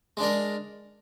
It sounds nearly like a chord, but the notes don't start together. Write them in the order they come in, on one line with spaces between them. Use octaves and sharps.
G#3 D4 A#4